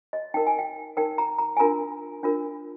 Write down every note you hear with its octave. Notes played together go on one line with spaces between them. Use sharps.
D#5
D#4 A#4 G5
G#5
G5
D#4 A#4 G5
A#5
A#5
G#5
D4 F4 A#4 A#5
D4 F4 A#4